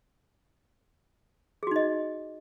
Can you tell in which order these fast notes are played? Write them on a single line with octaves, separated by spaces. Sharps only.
G#4 F#4 D#4 D#5